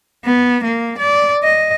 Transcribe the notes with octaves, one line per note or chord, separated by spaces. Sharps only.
B3
A#3
D5
D#5